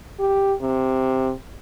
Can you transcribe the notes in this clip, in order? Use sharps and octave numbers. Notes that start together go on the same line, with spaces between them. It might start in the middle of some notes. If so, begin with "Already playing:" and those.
G4
C3